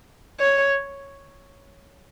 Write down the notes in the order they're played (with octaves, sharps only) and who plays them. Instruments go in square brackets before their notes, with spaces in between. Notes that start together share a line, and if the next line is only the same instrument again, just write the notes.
[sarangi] C#5